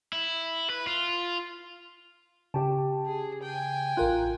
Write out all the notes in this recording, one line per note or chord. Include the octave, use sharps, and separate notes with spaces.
E4
B4
F4
C#3 G4 A5
G#4
G5 G#5
A1 F4 A#4 F#6